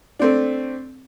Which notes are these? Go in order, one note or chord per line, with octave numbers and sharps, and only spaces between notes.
A3 C4 D4